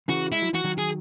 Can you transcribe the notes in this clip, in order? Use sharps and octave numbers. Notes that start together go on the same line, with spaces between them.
C#3 E3 F#4
G#3 E4
F#3
E3 F#4
D#3 F#3
G#4